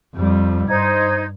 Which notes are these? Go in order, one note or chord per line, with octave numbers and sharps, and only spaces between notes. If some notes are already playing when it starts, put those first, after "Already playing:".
F2 G3
G2 D#4 C5 G#6